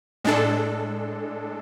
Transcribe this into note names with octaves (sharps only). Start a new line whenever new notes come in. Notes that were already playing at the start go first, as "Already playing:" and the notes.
A2 G#3 D4 A4